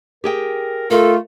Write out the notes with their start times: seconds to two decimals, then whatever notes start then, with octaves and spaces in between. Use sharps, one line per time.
0.24 G4 G#4 A#4 G5
0.91 A3 F4 A4 A#4